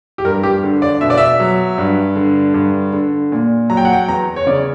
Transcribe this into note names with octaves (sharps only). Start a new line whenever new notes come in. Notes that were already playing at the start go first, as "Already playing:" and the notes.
G4
G2 A#4
G4
D3
D5
B2 E5
D5
E5
F#3
G2
D3
G2
D3
A#2
F#3 A#5
G5
F#5
G5
E2 A#5
C#5
C#3 D5